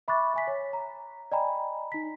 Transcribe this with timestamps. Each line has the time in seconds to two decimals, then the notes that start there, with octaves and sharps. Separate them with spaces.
0.08 E5 B5 C#6 D6 F#6 A6
0.34 E5 G#5 B6
0.47 C#5
0.73 A#5
1.32 D5 D#5 G5 G#5 A#5 B5
1.92 D#4 B6